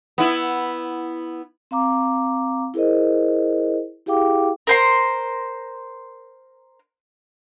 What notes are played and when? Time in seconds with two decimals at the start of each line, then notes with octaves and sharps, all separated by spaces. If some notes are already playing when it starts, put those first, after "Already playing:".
0.18 B3 E4
1.71 C4 F5 A#5 D6
2.74 E4 G#4 A#4 C5 D#5
4.06 E4 G4 G#4 F5 G5 D6
4.67 A#4 C5 C6